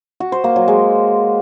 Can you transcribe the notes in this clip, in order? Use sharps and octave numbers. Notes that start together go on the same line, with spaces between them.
F#4
C5
A#3
F#3
G#3